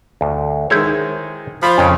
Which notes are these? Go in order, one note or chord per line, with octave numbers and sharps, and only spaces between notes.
D2
D#3 G#3 E4 C5 C#5
F3 B5
F2 C#3 C#4 C#5